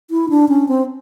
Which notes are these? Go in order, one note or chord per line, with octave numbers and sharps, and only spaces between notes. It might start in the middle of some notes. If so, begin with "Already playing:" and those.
E4
D4
C#4
C4